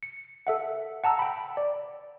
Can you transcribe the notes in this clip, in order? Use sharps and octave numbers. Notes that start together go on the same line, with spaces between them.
C#7
A4 E5 F#5
F#5 A5 A#5 E6
G5 B5
D5